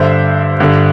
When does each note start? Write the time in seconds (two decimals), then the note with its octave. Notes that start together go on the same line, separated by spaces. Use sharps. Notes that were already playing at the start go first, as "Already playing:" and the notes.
Already playing: G2 D3 C5 E5
0.60 G2 D3